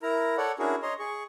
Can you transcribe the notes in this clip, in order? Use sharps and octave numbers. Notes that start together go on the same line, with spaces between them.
E4 A#4 A#5
A4 C#5 D5 F#5
C#4 D4 E4 F#4 G#4 A#4
C#5 D#5 A#5 C6
G#4 C#6